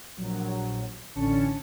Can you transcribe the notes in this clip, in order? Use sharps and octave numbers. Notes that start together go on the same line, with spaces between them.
A#1 F#3
A1 D3 C#4 A5 C#7